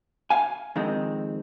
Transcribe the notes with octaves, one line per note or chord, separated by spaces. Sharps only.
F5 G#5
F2 D#3 G#3 C4